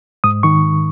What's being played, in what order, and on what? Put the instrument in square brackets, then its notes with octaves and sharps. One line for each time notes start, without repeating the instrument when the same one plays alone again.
[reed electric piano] G#2 D#6
D#3 C#6